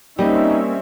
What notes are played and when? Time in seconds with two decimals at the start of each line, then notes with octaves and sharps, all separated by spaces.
0.19 G3 A#3 C4 C#4 D#4 D#5 E5